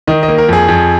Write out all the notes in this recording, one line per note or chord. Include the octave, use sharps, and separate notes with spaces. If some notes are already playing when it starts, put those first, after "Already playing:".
D#3 D#5
D#5
A#3
A#4
F2 G#4
F2